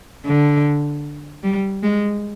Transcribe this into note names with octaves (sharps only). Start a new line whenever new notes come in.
D3
G3
G#3